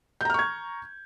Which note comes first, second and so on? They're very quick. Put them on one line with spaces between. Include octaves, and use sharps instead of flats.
G6 A#5 F6 C#6 G#6